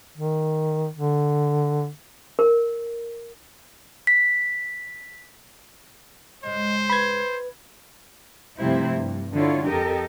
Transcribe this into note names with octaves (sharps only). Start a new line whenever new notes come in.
D#3
D3
A#4
B6
G#2 C#3 G#3 C5 D#5
B4 B5 G#6
G2 C3 F3 A3 E4 C5
G2
D3 E4 F4 C#5
F2 G4 A4 A#4 D#5